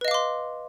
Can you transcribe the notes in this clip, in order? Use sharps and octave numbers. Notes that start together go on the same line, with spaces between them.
B4 D#5 F5 C6 D6